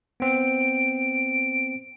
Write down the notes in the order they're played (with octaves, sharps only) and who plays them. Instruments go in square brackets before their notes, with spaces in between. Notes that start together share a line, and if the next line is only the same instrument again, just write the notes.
[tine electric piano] B3 C4 [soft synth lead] D7